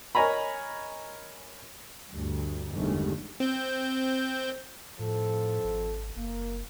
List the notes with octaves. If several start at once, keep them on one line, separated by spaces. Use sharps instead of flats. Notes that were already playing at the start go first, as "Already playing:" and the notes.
A#4 C#5 D#5 G#5 A#5 B5
D2 G2
G1 E2 G2 D#3 G#3 A3
C4 G6
F2 A2 F3 A4
G#1
F#1 A#3